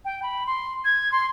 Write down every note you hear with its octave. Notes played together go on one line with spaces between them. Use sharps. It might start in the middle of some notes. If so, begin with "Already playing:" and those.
G5
B5
C6
G#6
C6